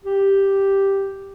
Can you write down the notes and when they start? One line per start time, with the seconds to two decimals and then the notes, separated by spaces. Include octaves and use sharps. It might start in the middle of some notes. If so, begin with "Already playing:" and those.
0.05 G4